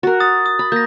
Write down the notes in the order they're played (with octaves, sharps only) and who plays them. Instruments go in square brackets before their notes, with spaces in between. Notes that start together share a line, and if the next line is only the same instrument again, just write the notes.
[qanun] F#4 A#4
[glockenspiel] D#6 A6
D#6
[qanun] B5
[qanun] A#3 [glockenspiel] G6 A#6